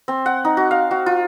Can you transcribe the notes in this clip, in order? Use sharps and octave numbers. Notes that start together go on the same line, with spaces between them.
C4
F#5
D#4
F#4
F5
F#4
F4